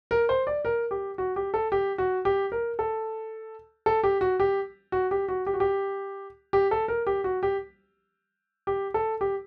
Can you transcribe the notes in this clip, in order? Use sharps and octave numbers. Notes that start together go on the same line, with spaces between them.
A#4
C5
D5
A#4
G4
F#4
G4
A4
G4
F#4
G4
A#4
A4
A4
G4
F#4
G4
F#4
G4
F#4
G4
F#4
G4
G4
A4
A#4
G4
F#4
G4
G4
A4
G4